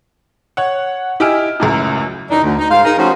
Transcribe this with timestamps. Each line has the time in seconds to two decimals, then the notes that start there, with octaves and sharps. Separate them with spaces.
0.57 C#5 F#5
1.20 E4 G4 D#5 G#5 F6 D7
1.60 C#2 F#2 A2
2.30 F#2 E3 D4 D#4
2.43 D2
2.59 D#4
2.70 G#2 A#4 C5 F5
2.85 D#4 G#4 A#4
2.98 F3 A3 C#4 D#4 F#4 C5